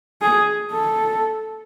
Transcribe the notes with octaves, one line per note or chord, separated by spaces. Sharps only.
G#4
A4